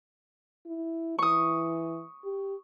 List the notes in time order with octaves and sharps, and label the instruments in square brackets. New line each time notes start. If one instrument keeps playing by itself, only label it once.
[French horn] E4
[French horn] E3 [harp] C#6 D#6
[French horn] G4